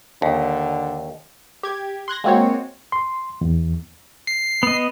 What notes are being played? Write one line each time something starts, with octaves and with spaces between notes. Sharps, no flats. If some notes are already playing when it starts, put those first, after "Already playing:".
D#2 D3
G4 G#6
C6 F#6 G#6 A#6
G#3 A#3 C4 F#4 C#5
C6
E2
C7
B3 D#5